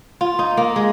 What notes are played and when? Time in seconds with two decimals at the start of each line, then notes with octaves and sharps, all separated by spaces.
0.21 F4
0.39 D#4
0.57 A#3
0.76 G#3